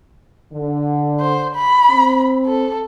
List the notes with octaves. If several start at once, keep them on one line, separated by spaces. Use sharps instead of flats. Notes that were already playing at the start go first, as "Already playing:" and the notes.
D3
C5
B5
C4
A4